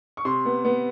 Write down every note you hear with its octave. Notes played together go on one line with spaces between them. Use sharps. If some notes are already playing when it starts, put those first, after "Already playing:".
C#6
C3 C6
B3
B3